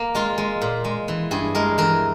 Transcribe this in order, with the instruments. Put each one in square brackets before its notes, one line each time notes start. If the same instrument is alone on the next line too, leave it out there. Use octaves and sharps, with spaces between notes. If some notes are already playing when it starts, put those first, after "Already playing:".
Already playing: [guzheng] A#3
G#3 F4
G#3
A#2
G#3
E3
G2 G#4
G#3 A#4
E3 A#4